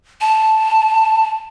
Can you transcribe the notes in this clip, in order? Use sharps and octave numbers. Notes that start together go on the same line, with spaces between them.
A5